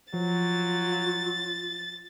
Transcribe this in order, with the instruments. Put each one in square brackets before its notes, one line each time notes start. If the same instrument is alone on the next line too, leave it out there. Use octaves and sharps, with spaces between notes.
[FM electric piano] F3 [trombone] F#3 [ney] F4 [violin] A6